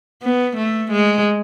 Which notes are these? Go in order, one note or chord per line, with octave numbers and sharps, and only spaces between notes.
B3
A3
G#3